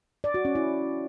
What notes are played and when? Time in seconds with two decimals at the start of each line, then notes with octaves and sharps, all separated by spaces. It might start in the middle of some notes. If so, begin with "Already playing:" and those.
0.24 D5
0.34 F#4
0.45 C#4
0.55 E4